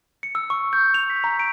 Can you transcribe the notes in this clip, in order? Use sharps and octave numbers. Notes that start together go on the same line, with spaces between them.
C#7
E6
C#6
G6
F7
B6
A#5
D7